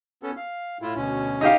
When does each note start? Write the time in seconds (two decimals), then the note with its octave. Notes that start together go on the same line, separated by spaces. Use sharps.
0.23 B3 C#4 A4
0.37 F5
0.82 A2 E4 F4
0.96 D2 B2 C#4
1.41 D#4 G4 F5